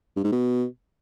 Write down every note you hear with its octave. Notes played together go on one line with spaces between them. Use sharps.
G2
G#2
B2